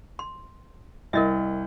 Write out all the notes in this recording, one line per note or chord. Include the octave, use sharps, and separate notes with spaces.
C6
C2 A#4 D#5 E5